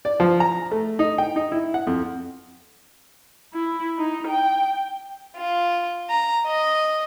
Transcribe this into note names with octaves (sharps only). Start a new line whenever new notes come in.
D5
F3
A#5
A3
D#4
G5
D#4
E4
F#5
F2
E4
D#4
G5
F4
A#5
D#5